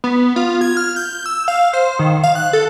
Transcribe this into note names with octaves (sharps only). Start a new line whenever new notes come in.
B3
F4
G#6
F6
G6
E6
F5
C5
D#3
F5
F#6
A4